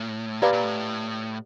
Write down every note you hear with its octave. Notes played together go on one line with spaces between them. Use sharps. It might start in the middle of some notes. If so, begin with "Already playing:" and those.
Already playing: A2
A#2 G4 B4 D5 F5 A#5
A#2
A2